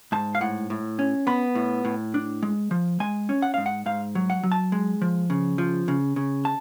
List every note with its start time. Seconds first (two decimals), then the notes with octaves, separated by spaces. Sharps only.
0.12 G#2 A5
0.35 F5
0.41 A2 F#5
0.70 A2
0.99 C#4
1.27 B3 B5
1.55 A2
1.85 A2
2.14 D4
2.43 G#3
2.71 F3
3.00 G#3 G#5
3.29 C#4
3.42 F#5
3.54 G#2 F5
3.66 F#5
3.86 G#2 F5
4.15 F#3
4.30 F#5
4.43 F#3
4.52 A5
4.72 G#3
5.02 F3
5.30 C#3
5.58 F3
5.88 C#3
6.16 C#3
6.45 A5